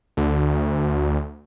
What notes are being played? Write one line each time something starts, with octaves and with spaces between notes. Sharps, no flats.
D2